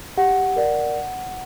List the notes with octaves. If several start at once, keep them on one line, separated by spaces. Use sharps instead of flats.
G4 F#5
A#4 D5